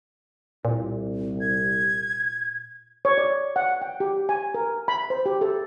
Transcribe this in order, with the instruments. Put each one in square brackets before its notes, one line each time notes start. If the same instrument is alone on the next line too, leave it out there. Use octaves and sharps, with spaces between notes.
[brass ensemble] C2 [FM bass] A#2
[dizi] G#6
[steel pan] C#5
D5
F#5
G5
G4
G#5
A#4
B5
C5
G4
A4